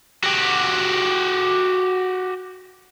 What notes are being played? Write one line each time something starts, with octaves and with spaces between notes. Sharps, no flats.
F#4 G4